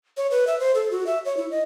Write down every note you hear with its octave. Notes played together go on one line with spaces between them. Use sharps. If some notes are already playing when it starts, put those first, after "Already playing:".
C#5
B4
E5
C5
A4
F#4
E5
C#5
E4
D#5